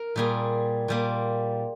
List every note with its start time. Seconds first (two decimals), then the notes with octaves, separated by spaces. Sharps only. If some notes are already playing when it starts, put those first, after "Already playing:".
Already playing: A#4
0.16 A#2 G3 A#3 G#4
0.88 A#2 G3 A#3